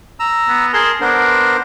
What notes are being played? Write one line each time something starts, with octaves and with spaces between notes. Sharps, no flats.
A#5 E6
B3
G#4 A#4 A5 C6
B3 D4 A#4 C5